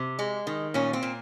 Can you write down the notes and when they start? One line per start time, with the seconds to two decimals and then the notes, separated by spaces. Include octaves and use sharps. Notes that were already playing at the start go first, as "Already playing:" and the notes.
Already playing: C3
0.19 G#3
0.47 D#3
0.74 A#2 C#4
0.93 C4
1.03 A#2